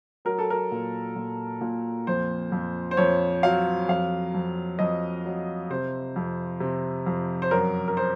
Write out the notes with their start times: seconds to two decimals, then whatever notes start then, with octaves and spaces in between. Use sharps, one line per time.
0.25 F#3 A#4
0.39 A4
0.50 A#4
0.71 A#2
1.16 A#2
1.61 A#2
2.07 F2 C5
2.52 F2
2.91 C5
2.97 F2 C#5
3.43 F#3 F5
3.88 F2 F5
4.34 F2
4.79 F2 D#5
5.25 F#3
5.70 C3 C5
6.16 F2
6.60 C3
7.06 F2
7.42 C5
7.51 F#2 A#4
7.88 A#4
7.97 C5